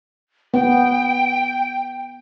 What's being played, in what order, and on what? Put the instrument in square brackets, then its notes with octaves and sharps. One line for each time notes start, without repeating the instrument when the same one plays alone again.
[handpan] B3 [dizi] G5